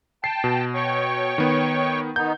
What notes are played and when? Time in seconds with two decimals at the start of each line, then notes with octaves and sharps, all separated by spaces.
0.24 G5 A5 C7
0.44 B2
0.75 C#5 G5 C#6
1.38 D#3 B3
2.16 D#3 B3 D#4 G6